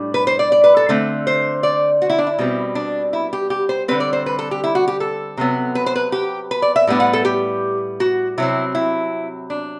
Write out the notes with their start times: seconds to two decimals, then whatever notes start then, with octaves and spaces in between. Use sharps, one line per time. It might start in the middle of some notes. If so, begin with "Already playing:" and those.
Already playing: A2 G3 D4
0.14 B4
0.27 C5
0.39 D5
0.52 D5
0.64 B4
0.77 A4
0.89 D3 A3 C4
1.27 C5
1.63 D5
2.02 F#4
2.10 E4
2.18 D4
2.27 E4
2.39 B2 G3 C4
2.75 D4
3.13 E4
3.33 G4
3.50 G4
3.69 C5
3.88 D3 G3 C4 B4
4.00 D5
4.13 C5
4.26 B4
4.39 A4
4.51 G4
4.64 E4
4.75 F#4
4.88 G4
5.00 A4
5.37 C3 F#3 B3
5.75 B4
5.86 C5
5.96 B4
6.12 G4
6.51 B4
6.62 D5
6.76 E5
6.87 A2 G3 B3 D4
7.00 F#5
7.13 A4
7.25 G4
8.00 F#4
8.38 C3 F#3 C4 E4
8.75 E4
9.50 D4